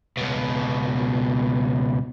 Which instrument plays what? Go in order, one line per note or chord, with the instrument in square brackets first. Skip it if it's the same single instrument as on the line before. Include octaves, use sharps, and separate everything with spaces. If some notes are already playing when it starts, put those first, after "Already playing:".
[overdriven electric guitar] C#2 B2